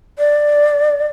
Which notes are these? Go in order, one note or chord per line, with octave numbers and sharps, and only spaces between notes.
D5